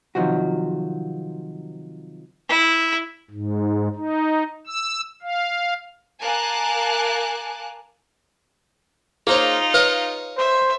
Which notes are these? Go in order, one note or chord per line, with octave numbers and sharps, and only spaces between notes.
C3 D#3 F3 F#3 F#4
E4
G#2
D#4
E6
F5
A#4 F5 G#5 A5 D6 F#6
A#3 D#4 F4 G#4 C5 C#5
B4 C#5 D#5 F5
C5 E5